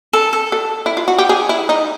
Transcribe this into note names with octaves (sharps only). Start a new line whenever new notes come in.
A4
A4
A4
E4
F4
F#4
G4
G#4
E4
D#4